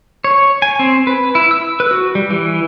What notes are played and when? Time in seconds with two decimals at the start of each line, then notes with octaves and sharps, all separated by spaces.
0.24 C#5
0.62 G#5
0.79 C4
1.07 B4
1.35 E4
1.51 E6
1.80 B4
1.91 F#4
2.15 G3
2.31 E3